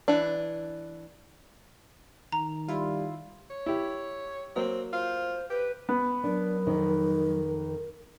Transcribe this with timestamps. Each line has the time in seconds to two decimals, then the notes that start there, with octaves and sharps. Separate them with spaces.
0.08 E3 D4
2.32 D#3 A#5
2.68 G3 E4 F4
3.50 C#5
3.66 E4 G4
4.56 F#3 A#3 C4
4.93 F4 C5
5.50 G4 B4
5.89 B3
6.24 F#3 D4 A#4
6.67 F2 D#3 D#4